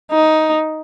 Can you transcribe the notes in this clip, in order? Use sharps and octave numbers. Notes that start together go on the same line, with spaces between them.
D#4